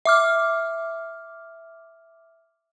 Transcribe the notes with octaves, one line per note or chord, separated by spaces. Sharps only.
E5 D6 F6